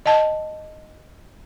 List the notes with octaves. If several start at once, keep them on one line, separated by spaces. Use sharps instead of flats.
D#5 F#5 A5